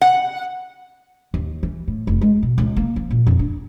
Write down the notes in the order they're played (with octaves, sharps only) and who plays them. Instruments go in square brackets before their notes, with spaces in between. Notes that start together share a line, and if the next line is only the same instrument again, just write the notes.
[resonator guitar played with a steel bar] F#5
[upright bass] D#2
E3
A2
F1
G#3
B2
C#2
A#3
F3
A#2
F2
D4